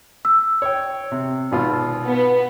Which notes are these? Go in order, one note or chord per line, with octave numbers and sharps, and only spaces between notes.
E6
C#5 G5
C3
G#1 B2 F4
B3